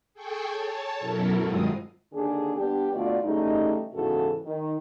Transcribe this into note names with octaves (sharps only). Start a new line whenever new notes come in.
G#4 A4 G5 G#5 C#6
C#5 A5
F#2 B2 F#3 E4 A4 A#4
G2 D#3 G#3 C4 F4 D#6
D#2 D3 D4 G#4
G3 B3 D4 G4
B2 D3 A3 F4 D5
C#3 E3 G3 A3 D#4
E2 G#2 C#3 E3 F#4 A4
D#3